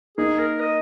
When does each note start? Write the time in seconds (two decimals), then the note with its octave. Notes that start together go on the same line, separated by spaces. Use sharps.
0.18 A#3 D#4 G#4
0.39 A#4
0.60 D#5